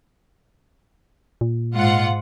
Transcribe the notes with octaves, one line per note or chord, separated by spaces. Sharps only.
A#2
G#2 F4 F#5